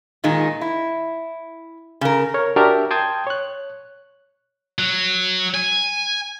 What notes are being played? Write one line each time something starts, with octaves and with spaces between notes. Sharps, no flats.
A#2 D#3 G#3 D#4
E4
C#3 A#4
A#4 C#5
D4 F#4 G4 A#4 E5 A5
G5 A5 C6 D#6 G6 G#6
C#5 F#6
F#3
G#5